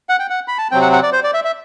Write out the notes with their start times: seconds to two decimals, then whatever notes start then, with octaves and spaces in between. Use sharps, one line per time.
0.09 F#5
0.19 G5
0.30 F#5
0.48 B5
0.58 A5
0.71 C3 F#3 C4 G5
0.82 F#5
0.92 F#5
1.03 D5
1.13 C5
1.24 D5
1.34 E5
1.44 E5